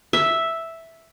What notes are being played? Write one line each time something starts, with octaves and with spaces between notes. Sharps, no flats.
E5